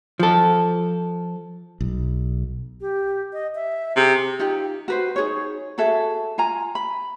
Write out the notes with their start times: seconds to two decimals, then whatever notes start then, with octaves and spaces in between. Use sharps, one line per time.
0.19 F3 A4
1.81 B1
2.81 G4
3.33 D#5
3.55 E5
3.97 C3 G#4
4.39 D#4 F4 G4
4.88 F#4 B4 C5
5.16 D#4 G#4 C#5
5.78 F#4 G#4 A4 E5
6.38 F4 G#5 A#5
6.75 B5